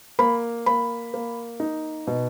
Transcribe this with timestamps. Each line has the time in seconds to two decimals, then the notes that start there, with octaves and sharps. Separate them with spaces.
0.19 A#3 B5
0.66 A#3 B5
1.14 A#3
1.60 D#4
2.07 B2